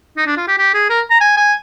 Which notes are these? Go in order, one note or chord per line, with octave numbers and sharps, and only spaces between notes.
D#4
D4
F4
G4
G4
G#4
A#4
A#5
G#5
G#5